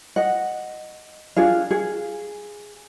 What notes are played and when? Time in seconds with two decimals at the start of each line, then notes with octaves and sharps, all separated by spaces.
0.16 D#5 F#5
1.36 D4 F4 G#4 F5
1.71 G#4